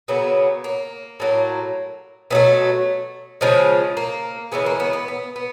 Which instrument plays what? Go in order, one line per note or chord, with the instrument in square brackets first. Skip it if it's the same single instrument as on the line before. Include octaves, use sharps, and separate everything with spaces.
[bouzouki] C#3 F#3 A#3 B3
A#3
A2 F#3 A#3
B2 F#3 A3 B3
C#3 F3 G#3
A#3
C#3 E3 G#3 B3
A#3
B3
B3
B3
B3